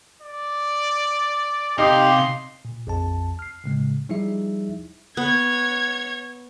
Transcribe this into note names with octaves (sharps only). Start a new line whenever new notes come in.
D5
C3 D#4 G4 F5 C6
A#2
A#1 F2 A5
F6 C7
A2 C#3 G#3
F3 G3 D#4 E4 G#4 E5
B3 C#5 G#6